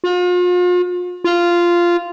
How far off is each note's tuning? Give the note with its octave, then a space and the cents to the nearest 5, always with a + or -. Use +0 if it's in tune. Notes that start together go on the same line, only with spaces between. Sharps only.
F4 +40
F4 -10